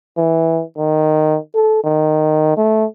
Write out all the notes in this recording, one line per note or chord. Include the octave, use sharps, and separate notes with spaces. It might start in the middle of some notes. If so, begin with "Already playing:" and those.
E3
D#3
A4
D#3
A3